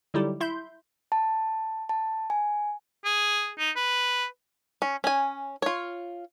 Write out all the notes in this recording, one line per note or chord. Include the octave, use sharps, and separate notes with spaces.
D3 F#3 G3 D#4 E4 G4
E4 E5 C6 G6
A5
A5
G#5
G#4
D#4
B4
C#4
C#4 G#5
F4 C#5